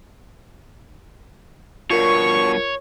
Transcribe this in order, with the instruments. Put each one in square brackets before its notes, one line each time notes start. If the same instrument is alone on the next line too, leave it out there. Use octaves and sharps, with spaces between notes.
[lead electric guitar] G2 B2 [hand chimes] F4 A#4 [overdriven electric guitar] C#5 [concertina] C#6